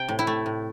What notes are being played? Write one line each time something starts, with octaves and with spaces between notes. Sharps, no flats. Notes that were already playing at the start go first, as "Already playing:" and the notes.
Already playing: C3 G5
A2
E4
A3
A2